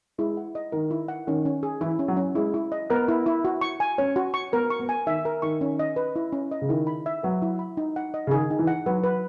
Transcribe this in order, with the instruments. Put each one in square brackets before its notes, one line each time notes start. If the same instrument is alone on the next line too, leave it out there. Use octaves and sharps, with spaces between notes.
[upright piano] G#3 [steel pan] E4
[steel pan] F#5
D#5
[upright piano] D#3 [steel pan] A#4
[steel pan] E4
F#5
[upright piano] D#3 [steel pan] C#4
[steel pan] C#4
G#4
[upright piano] E3 [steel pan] E4
[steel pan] C#4
[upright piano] F#3
[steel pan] C#4
[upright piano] G#3 [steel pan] E4
[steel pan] E4
D#5
[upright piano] B3 [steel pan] A#4
[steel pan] E4
E4
F#4
C#6
G#5
[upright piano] C#4 [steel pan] C#5
[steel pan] F#4
C#6
[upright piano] B3 [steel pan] A#4
[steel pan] C#6
[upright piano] B3
[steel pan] G#5
[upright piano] D#3 [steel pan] E5
[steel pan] A#4
[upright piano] D#3 [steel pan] C#6
[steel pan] C#4
D#5
B4
E4
C#4
D#5
[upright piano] C#3
[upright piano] D#3 [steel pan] E4
[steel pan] B5
E5
[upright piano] F#3 [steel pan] B4
[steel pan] E4
B5
D#4
F#5
D#5
[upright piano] C#3
[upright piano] D#3 [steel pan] G#4
[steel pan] D#4
[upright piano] E3
[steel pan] F#5
[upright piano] F#3 [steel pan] B4
[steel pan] B4